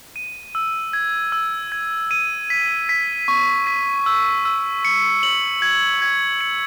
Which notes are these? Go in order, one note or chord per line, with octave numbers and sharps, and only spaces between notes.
D#7
E6
G#6
E6
G#6
D#7
B6
B6
C#6
B6
E6
E6
C#7
F#7
G#6
G#6
C#7